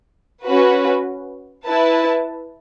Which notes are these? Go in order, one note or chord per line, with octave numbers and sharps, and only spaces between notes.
C#4 F#4 B4
E4 B4 A5